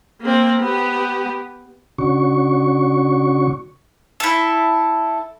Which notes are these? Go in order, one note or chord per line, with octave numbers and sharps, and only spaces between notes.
A#3 C4
B3 G4
C#3 C#4 D4 F#4 C#6
E4 A4